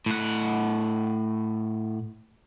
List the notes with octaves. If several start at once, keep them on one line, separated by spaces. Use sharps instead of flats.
A2 F#5